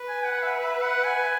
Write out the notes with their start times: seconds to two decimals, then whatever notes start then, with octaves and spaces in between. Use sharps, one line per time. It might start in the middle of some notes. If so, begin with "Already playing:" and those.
Already playing: B4
0.08 G#5
0.25 F#5
0.42 E5
0.59 E5
0.82 F#5
1.04 G#5